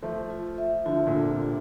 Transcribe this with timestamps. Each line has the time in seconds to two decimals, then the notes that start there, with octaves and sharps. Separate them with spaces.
0.02 F3 A3 A4
0.30 F4
0.58 E5
0.86 D3 F3 F4
1.07 A#2 D3
1.14 A4
1.28 C3
1.41 F4